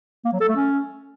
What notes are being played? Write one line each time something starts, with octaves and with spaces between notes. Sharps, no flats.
A#3
F#3
A4
A3
C#4